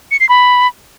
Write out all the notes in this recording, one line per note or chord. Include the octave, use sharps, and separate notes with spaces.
C#7
C7
B5